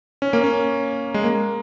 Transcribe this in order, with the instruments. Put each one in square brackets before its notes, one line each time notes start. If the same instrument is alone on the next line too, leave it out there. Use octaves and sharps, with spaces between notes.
[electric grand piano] C#4
A#3
C#4
G#3
A#3